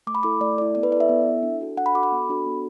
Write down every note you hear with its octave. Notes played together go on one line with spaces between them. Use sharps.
A3 D6
B5
E4 A4 D6
A3 D5
E4 A4 D5
B3 D5
B4
E4 A4 D5 E5
B3
E4 A4
D4
F#4 A4
D4 F#5
B5
F#4 A4 D6
B5
B3
D4 F#4 A4
B3